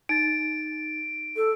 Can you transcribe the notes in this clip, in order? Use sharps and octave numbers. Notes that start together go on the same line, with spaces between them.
D#4 A6 D7
A4